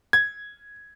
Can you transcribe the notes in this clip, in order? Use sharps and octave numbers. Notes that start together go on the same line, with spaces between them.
G#6